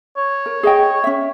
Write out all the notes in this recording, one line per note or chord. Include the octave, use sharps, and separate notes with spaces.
C#5
A#4
G#4 D#5 G5
C#4 E5